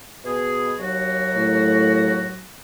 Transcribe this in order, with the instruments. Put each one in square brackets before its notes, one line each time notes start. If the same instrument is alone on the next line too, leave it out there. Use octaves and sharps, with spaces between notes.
[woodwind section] B2 G#4
D#2 F#3 F#4
[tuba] A2